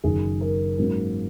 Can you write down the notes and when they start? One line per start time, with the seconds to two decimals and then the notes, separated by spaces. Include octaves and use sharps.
0.03 F#1 F#2 D#3 G#4
0.41 A#4
0.78 G#2 F#3 A#3 C#4